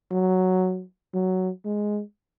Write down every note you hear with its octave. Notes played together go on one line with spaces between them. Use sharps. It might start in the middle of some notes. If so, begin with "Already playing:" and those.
F#3
F#3
G#3